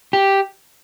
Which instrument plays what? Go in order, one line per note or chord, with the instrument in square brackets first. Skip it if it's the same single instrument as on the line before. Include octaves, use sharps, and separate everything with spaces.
[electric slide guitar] G4